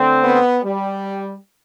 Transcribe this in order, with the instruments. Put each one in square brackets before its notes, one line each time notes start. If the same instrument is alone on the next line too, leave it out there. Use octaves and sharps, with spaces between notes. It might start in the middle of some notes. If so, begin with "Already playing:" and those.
Already playing: [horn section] D3 A3 C4
[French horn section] B3
G3